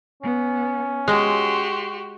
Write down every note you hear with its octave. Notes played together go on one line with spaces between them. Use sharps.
B3 C#4
G#3 F#4 G4 C6